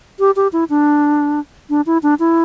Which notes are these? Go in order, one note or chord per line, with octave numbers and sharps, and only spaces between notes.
G4
G4
E4
D4
D4
E4
D4
E4